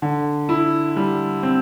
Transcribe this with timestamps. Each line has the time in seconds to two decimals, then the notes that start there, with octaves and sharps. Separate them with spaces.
0.02 D3
0.49 E4
0.96 G3
1.43 C4